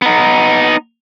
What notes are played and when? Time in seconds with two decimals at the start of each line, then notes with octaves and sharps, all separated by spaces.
0.02 B3 D#4